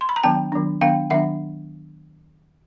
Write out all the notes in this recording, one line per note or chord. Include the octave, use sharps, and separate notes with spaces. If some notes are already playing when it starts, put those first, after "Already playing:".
C6
B5
A#5
D#3 F#3 B3 D4 G5 A5
D#3 F#3 B3 D4
D#3 F#3 B3 D4 F5 G5
D#3 F#3 B3 D4 E5 F#5